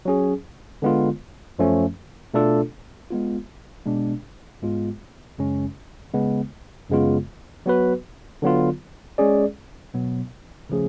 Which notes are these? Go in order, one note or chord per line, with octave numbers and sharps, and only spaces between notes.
F#3 C#4 G#4
D3 G#3 B3 F4
F#2 F3 A3 C#4
B2 A3 D4 F4 A4
G#3 B3 F4
B2 G#3 B3 D4
G#2 G#3 B3 F4
F#2 C#3 G#3 C#4
C#3 G#3 B3
F#2 C#3 G#3 B3 F4
F#3 B3 F#4 B4
D3 F#3 B3 F4
G#3 C#4 G#4 D5
B2 F#3 B3
C#3 F3 A3 C#4 G#4